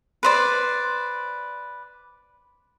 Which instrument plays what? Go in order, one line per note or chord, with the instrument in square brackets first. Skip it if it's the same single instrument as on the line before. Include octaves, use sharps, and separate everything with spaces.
[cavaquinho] B4 C5 D5